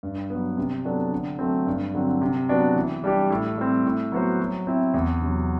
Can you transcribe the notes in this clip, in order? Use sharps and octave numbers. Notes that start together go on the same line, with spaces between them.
G2
F#3 B3
C3
F#3 B3 D4 A4
D3
F#3 A3 C4
G2
D3 F#3 C4
C3
F#3 B3 D4 F#4
E3
G3 D4 G4
A2
G3 C4
A2
F#3 B3 F#4 C5
F#3
C4 E4
E2
C3 F#3